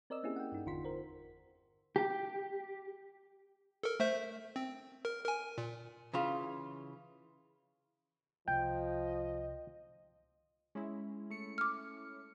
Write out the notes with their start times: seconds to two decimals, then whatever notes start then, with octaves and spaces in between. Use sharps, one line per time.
0.10 C4 A#4 D5 D#5 E6
0.23 A#3 C4 C#4 E4 G4 G#4
0.36 F#5 G5
0.52 G2 D#4
0.66 G1 E2 D3 F4 C6 B6
0.85 A#4 C5
1.96 G4
3.83 A4 A#4
4.00 A3 C5 E5
4.56 C4
5.05 A#4
5.25 A#4 G#5
5.58 A#2
6.13 C#3 E3 F4
8.48 C2 F3 D#5 G5
10.75 G#3 C#4 E4
11.30 A3 C#7
11.58 D6 F6